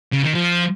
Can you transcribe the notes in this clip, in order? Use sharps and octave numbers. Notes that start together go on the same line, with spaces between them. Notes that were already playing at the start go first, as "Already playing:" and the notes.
C#3
D#3
F3